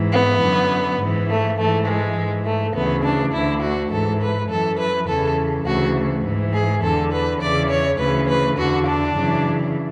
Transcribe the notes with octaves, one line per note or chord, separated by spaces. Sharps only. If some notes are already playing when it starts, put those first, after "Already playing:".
Already playing: G#2 E3
B3
F#2 D3
G#2 E3
A3
G#2 E3 A3
G#3
G#2 E3
A3
D2 C#3 E3 B3
D4
D2 D3 E4
F#4
G#2 E3 A4
B4
F#2 E3 A4
B4
E2 C#3 E3 A4
D2 C#3 E3 F#4
G#2 E3
G#4
E2 D3 A4
B4
E2 C#3 E3 D5
C#5
D2 C#3 E3 B4
B4
E2 D3 F#4
D4
F#2 C#3 E3